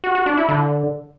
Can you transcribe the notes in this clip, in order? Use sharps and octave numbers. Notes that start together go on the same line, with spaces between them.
F#4
F#4
D4
E4
D3